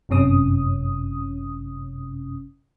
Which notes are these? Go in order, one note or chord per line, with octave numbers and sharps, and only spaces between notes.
G1 F#2 C3 C#4 D#6